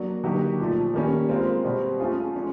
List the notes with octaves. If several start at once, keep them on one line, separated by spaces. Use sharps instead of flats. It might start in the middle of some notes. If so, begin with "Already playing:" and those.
Already playing: F#3 A#3 D4 F#4
D3 F#3 A#3 D#4 G4
A#2 F3 A3
D#3 G3 A#3 C#4
G#3 C4 F4 A#4
B2 G3 C4
A3 C#4 F4 G#4
F3 G#3 C#4